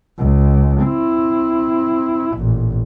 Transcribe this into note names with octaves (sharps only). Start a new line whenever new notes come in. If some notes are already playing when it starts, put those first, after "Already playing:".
C#2
C4 E4
A1 A#2